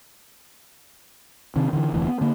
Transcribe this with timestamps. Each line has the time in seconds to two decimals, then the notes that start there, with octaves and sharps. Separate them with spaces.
1.56 C3 D#3
1.73 D3 E3
1.93 F1 D2 E3
2.07 B3
2.21 D3 A#3